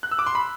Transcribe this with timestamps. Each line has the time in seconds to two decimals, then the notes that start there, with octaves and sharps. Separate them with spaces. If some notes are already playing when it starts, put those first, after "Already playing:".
0.03 F#6
0.11 E6
0.19 D6
0.27 C6
0.35 B5